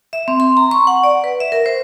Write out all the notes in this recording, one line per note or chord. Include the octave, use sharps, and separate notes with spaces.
E5
C4
C6
A#5
C#6
F#5
D5
B4
E5
A#4
C5